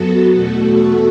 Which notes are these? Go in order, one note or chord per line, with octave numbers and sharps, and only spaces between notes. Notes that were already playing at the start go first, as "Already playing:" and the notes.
Already playing: F#2 F#3 B3 F#4 A4
E2 B2 A3 F#4 A4